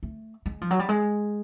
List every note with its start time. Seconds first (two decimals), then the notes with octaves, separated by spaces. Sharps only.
0.03 A3
0.46 G#3
0.61 F3
0.71 F#3
0.79 G3
0.89 G#3